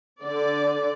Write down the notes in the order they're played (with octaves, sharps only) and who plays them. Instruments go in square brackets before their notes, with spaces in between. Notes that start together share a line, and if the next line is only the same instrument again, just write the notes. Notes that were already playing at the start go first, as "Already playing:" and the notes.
[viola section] D3 D5